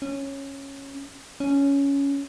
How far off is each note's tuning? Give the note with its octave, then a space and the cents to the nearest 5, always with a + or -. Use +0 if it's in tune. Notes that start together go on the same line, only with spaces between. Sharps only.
C#4 -10
C#4 +10